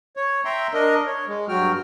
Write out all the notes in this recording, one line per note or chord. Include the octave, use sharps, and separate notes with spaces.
C#5
E5 G5 A#5 C6
D4 A#4 D#5
C#5
G#3
G2 F#3 F#4 G5 F6